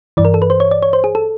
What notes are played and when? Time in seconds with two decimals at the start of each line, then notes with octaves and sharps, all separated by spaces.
0.17 G2 E3 D5
0.25 A#4
0.34 A4
0.42 B4
0.50 C5
0.60 C#5
0.71 D5
0.83 C#5
0.93 C5
1.04 G#4
1.15 A4